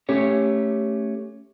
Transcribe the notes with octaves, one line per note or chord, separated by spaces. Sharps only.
A3 C#4 G4 C#5